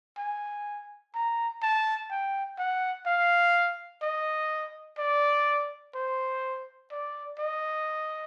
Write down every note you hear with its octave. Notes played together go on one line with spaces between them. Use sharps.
G#5
A#5
A5
G5
F#5
F5
D#5
D5
C5
D5
D#5